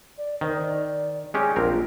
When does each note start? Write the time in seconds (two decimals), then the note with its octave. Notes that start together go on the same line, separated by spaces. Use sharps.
0.18 D5
0.41 D#3 C5
0.56 D5
1.34 G#3 C#4 G4 G#4
1.56 A#1 C4 F4 A#4